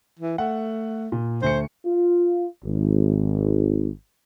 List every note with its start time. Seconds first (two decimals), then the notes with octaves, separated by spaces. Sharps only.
0.19 E3
0.38 A3 F#5
1.12 A#2
1.42 D2 A3 C5 C#7
1.86 F4
2.65 G#1